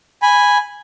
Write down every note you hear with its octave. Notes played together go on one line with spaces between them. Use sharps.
G#5 B5